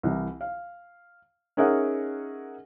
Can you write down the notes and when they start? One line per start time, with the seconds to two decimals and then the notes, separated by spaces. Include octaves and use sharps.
0.03 C2 E3
0.41 F5
1.57 C#4 D#4 G#4 A#4 E5 F#5